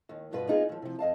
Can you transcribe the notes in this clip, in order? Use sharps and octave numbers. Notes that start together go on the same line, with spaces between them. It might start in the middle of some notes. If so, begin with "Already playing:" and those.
D#2 D#3
G2 B2 F4 B4
A#3 B3 D#4 F4 G4 G#4
D#2 F3
C3 F3
F2 D#5 F5 A5